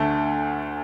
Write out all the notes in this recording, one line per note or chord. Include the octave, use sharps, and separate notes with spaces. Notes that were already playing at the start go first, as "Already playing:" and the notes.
Already playing: D2 D3 A3